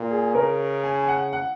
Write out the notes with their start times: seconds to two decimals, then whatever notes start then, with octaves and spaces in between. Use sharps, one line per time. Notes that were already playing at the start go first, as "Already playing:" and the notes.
Already playing: A#2
0.11 G#4
0.35 C#3 A#4
0.84 G#5
1.03 G#5
1.08 F#5
1.33 F#5